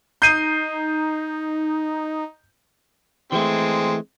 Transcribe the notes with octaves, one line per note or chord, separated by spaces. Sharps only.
D#4 G6 C7 D#7
E3 G#3 A3 C4